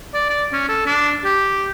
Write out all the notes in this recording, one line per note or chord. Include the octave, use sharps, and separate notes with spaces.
D5
D5
C#4
A4
D4
G4